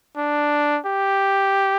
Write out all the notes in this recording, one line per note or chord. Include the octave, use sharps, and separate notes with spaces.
D4
G4